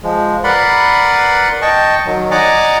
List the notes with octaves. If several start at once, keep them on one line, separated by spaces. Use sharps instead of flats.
F3 G#3
A#4 B4 D5 F#5 B5 C6
D#5 G5 A5 C#6
D#3 F#3
D5 D#5 F#5 G#5 A#5 D6